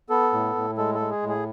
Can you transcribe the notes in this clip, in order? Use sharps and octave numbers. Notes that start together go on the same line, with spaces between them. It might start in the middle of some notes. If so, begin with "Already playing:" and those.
B3 A4
A2
A2
G#3 A4
A4
G#3
G#4
A2
G#4